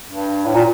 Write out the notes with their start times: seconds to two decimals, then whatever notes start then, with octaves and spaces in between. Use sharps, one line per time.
0.10 G2
0.46 A2
0.54 A#2